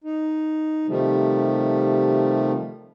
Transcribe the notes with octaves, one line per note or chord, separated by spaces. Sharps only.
D#4
C3 D#3 F3 G3 A3